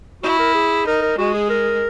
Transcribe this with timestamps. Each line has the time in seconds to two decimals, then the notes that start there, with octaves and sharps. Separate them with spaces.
0.23 E4 F#4
0.39 A#4
0.55 G#4
0.87 D#4 A#4
1.02 A#4
1.18 G#3 F#4
1.34 G#4
1.50 A#4